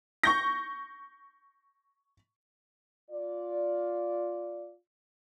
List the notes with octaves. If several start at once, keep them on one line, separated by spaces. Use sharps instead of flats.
C#6 G6 A#6
F4 D5